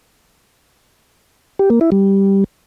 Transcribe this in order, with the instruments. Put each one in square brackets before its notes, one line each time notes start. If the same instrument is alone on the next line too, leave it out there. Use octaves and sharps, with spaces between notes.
[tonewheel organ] G4
A#3
E4
G3